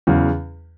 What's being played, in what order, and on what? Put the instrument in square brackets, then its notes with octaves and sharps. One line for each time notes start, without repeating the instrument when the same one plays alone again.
[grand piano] E2 C#3 F#3